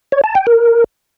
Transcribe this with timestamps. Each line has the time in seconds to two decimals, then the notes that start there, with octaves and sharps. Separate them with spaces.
0.12 C#5
0.24 A5
0.35 G5
0.47 A#4